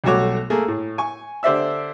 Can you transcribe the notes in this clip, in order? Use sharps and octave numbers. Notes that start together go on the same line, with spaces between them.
B1 G3 A3 F#4 C#5 D6
A3 A#3 G#4
A2
G#5 C#6
D3 G4 C5 D5 E5 E6